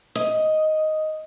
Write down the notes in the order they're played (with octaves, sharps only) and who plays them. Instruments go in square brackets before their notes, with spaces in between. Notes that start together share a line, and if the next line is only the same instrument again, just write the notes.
[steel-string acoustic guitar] D#5